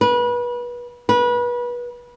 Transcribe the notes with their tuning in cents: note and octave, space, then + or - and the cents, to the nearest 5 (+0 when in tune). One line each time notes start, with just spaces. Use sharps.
B4 -30
B4 -30